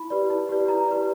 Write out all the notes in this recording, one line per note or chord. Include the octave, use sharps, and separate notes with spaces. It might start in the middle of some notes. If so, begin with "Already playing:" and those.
Already playing: E4 B5
G4 B4 D5
E4
G4 B4 D5
E4 A#5
G4 B4 D5